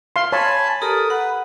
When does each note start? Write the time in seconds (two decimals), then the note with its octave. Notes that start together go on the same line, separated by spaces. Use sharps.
0.16 F5 C6
0.32 C#5 G#5 A5 B5
0.82 G4 A4 A#4 D#6
1.10 B4 F#5